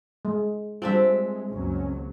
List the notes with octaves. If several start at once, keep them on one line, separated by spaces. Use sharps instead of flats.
G#3
G3 G#3 C4 D4 F4 E5
F#1 C#2 F#3 C#4